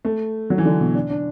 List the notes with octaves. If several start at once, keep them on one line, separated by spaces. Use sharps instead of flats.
A3
F#3
E3
D3
B2
D4
D4